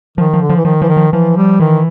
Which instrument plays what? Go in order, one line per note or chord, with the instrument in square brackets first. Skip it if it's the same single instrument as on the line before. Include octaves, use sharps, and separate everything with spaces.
[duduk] D#3 [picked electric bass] F3
[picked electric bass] F3
[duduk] D3
[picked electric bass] F3
[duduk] E3
[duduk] D#3 [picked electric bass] F3
[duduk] E3 [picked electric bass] F3
[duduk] D#3
[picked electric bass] F3
[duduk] E3 [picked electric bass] F3
[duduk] G3
[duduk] D#3 [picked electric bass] E3